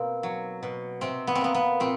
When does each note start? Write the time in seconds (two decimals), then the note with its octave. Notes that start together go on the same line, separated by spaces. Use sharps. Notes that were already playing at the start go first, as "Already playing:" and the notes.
Already playing: B2 A#3 C4
0.23 F#3
0.63 B2
1.01 C3 C4
1.27 B3
1.35 C4
1.41 A#3 B3
1.55 B3
1.80 A#2 C4